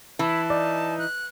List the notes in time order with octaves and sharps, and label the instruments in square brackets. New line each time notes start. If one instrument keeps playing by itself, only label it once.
[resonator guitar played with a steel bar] E3 [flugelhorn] E4 [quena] A5
[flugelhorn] D#4 [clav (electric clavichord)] D5
[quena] F#6